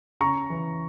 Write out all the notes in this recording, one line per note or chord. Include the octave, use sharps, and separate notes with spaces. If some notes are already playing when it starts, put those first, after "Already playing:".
C#3 A#5 C#6
E3